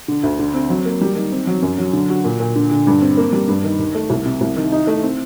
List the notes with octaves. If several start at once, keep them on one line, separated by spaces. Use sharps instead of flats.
D3
D2
D3
C4
F#3
A#3
G3
D#3
C4
F#3
F#2
F#3
D3
F#4
A#2
A#2
D3
D3
G2
C4
A#3
G3
G2
D#3
D#2
A3
C2
C3
C2
D#3
D#4
A3
C4